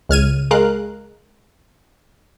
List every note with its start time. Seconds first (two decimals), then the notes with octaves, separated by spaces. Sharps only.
0.09 C#2 F6 G#6 D#7
0.51 G#3 A#4 F5 F#6